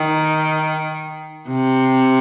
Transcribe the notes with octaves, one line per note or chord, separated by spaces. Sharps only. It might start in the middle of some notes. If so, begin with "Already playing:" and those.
Already playing: D#3
C3